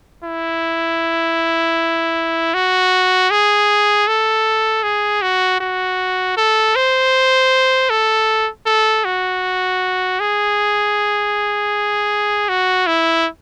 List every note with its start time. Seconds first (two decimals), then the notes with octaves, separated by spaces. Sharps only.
0.24 E4
2.54 F#4
3.30 G#4
4.07 A4
4.83 G#4
5.22 F#4
5.60 F#4
6.37 A4
6.75 C5
7.90 A4
8.66 A4
9.04 F#4
10.20 G#4
12.49 F#4
12.87 E4